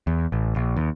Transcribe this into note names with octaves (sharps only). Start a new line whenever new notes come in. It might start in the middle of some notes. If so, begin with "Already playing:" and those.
E2
A1
A#1
D#2